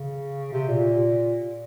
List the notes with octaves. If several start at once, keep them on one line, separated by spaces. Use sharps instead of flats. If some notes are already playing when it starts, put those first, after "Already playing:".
Already playing: C#3
C3
A#2